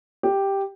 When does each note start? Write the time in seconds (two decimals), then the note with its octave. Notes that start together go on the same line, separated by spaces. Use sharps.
0.23 G4